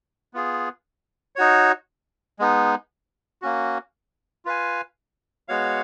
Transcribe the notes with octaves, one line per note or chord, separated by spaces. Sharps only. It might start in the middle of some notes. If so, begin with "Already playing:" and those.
B3 F4 G#4
D#4 F#4 C#5
G#3 B3 D#4
A#3 C#4 F#4
F4 B4 F5 G#5
G#3 B3 F#4 C#5 F5